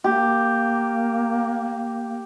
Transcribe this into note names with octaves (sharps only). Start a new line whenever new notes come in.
A#3 G4